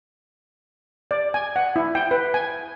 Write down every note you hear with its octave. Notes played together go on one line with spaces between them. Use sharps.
D5
G#5
F#5
E4
G5
B4
G#5